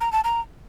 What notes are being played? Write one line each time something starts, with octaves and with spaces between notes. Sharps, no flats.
A#5
A5
A#5